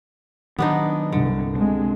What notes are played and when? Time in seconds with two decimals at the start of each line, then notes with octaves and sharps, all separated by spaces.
0.59 D#3 F#3 B3 D4 D#4
1.12 C2 G2 D3
1.56 C3 G#3 D4